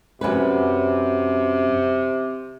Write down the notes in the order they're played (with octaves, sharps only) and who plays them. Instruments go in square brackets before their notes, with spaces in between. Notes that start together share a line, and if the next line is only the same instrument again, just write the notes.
[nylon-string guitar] F#2 C#4 B4 [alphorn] C3